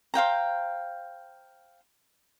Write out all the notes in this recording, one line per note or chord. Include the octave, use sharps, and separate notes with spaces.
C5 F5 G5 A#5